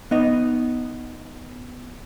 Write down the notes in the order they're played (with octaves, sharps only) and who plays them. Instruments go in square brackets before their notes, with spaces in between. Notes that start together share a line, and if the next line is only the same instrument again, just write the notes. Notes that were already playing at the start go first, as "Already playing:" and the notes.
[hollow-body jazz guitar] B3 D#4 D#5